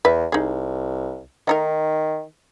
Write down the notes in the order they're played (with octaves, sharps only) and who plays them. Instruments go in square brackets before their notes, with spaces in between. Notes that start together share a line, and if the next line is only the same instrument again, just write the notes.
[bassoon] E2 [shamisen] B4 E5
[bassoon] C2 [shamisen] D#4 G#4
[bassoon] D#3 [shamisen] A3 D#4 A#4